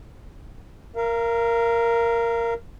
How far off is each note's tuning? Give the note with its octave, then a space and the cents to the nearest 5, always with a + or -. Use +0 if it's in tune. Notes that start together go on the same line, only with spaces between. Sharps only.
A#4 +0 F5 -35